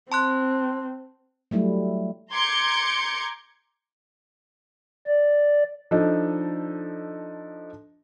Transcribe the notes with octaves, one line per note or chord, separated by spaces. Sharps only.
C4 A5 C6 F#6
F#3 G3 A3 E4
A#5 C6 D6 G6 G#6 C#7
D5
F3 D4 D#4 A4 D#5